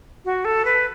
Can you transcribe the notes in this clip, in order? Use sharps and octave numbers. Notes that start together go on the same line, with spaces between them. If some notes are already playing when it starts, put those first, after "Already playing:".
F#4
A4
B4